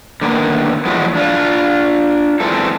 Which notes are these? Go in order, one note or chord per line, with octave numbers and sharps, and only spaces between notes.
D3 D#3 A#3 B3
E2 A2 F3 F#3 G#3 B3
D4 F4
E3 G#3 C4 A4